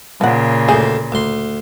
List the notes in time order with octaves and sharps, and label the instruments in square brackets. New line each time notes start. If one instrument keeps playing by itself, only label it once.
[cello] A#2 C#3 [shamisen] F3 F#5
[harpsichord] D2 A2 C5 [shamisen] G#4
[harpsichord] D2 C6